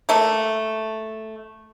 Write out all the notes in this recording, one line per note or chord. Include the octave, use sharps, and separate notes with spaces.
A3 A#3